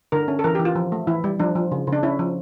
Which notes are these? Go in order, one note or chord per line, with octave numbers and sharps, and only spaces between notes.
D3 A#4
C#4
A4
E3 A#4
G4
E3
F4
F3
A3
E3 E4
G3
F3 D4
F3
C#3
C#3
D4
C#4 E4
F3